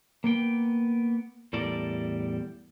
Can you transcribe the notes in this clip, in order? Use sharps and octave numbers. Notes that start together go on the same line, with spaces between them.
A#3 B3 G5
E2 A2 G3 A4 A#4 D5